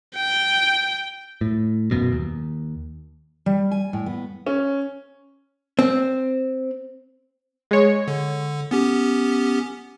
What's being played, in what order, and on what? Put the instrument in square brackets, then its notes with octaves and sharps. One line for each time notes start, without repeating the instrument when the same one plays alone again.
[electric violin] G5
[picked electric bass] A2
D#1 F#2 B2
D#2
[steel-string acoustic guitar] G3
G#5
A2
B3
[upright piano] C#4
[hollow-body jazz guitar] C4
[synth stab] G#3 C#5
[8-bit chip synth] D3
B3 C#4 G4